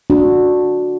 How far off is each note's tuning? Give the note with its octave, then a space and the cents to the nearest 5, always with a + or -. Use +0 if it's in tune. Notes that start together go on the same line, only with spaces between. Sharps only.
D4 +0 F#4 -20